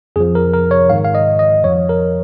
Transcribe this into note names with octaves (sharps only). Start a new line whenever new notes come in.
F2 F3 G#4
A#4
A#4
C#5
G#2 D#3 F5
F5
D#5
D#5
F2 F3 C#5
A#4